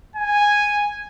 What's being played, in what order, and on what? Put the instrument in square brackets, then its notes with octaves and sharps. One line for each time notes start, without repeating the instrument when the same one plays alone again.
[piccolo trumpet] G#5